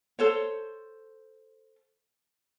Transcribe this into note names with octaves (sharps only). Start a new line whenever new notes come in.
A4 C5 C#5